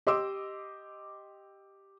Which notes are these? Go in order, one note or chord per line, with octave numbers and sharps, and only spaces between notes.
G4 D#5 C6 D6 E6